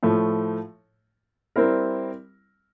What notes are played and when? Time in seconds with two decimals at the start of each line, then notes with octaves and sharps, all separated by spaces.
0.03 A2 F3 A3
1.56 G3 C4 E4 A#4